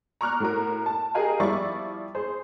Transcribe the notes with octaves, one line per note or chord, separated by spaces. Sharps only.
A#5 C#6 D6 F6 F#6
A2 F#4 A#4
A5
G4 G#4 A#4 D#5 F5 G#5
F3 G3 E4 D5 C#6 A6
G#4 C5